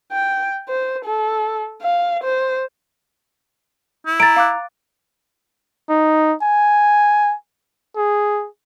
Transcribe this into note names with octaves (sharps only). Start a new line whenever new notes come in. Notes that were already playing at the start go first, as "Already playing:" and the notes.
G5
C5
A4
F5
C5
E4
A#5 A6 D7
F5 D6 F#6
D#4
G#5
G#4